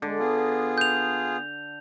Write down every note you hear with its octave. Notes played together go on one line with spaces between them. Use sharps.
D3 G#3
B3 F4 G#4
G6 F7